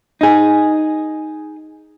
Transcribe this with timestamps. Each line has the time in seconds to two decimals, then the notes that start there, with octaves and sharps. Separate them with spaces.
0.21 D#4 G#4